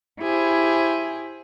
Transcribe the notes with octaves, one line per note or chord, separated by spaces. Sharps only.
E4 G4 G#4 C5